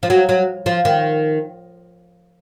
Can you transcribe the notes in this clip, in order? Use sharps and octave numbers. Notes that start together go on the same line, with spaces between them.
F3
F#3
F#3
F3
D#3